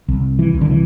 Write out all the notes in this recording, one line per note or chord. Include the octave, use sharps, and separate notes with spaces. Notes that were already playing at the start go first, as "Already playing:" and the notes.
C2
E3
C2
D3
E3